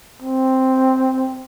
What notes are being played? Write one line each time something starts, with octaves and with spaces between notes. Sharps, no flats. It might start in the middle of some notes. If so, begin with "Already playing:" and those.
C4